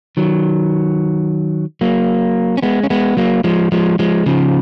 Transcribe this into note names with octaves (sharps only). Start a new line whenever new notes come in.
D#3 F#3
F#3 A#3
C#4
G#3 B3
C#4
G#3 B3
F#3 A#3
F3 G#3
F3 G#3
F3 G#3
C#3 F3